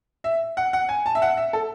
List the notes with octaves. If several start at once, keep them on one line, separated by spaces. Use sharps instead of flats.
E5
F#5
F#5
G#5
A5
E5
F#5
E5
A4